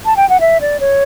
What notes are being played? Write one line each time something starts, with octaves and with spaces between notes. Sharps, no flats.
A5
G5
F#5
E5
D5
C#5